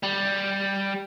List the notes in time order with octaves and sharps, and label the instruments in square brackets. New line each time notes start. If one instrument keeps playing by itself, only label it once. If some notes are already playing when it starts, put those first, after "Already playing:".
[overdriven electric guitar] G3